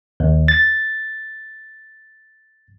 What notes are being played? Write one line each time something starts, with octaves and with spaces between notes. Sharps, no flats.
D#2
A6